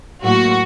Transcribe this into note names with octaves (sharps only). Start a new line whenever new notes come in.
A2 F#3 A#3 F#4